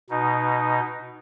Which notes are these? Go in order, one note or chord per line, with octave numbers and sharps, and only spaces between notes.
B2 D#4